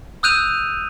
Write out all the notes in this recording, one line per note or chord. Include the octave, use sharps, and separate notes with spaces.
D#6 E6 F#6 G6 D#7 F7